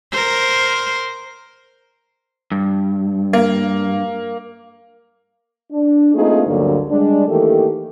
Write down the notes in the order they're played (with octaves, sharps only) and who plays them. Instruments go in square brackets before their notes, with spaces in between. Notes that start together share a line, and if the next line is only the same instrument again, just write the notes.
[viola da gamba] A#4 C5
[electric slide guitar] G2
[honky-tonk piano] A#3
[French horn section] D4
A3 A#3 C4 D#4 F4 G#4
D2 G2 D3 F#3 G3 A#3
G3 G#3 D4
D#3 E3 A3 A#3 G4 A4